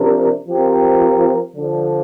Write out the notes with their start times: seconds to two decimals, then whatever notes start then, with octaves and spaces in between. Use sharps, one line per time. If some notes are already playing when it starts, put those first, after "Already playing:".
Already playing: C3 F3 D4 A#4
0.48 F3 C4 G4 A#4
1.54 D3 F3 D4